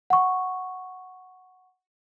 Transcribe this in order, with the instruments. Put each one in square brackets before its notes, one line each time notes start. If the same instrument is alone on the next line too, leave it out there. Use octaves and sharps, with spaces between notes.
[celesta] F#5 C#6